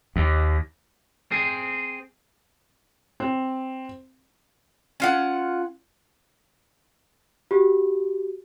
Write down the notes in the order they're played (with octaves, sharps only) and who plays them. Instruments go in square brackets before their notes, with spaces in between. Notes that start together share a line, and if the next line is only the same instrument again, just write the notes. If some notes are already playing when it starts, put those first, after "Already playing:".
[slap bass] D#2
[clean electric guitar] C4 G#4
[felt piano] C4
[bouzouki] C#4 F4 F#5
[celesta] F#4 G4